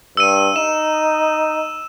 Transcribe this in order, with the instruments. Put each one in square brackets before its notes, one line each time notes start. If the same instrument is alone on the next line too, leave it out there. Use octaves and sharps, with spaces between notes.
[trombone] G2 [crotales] E6 D#7
[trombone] D#4 [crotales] E7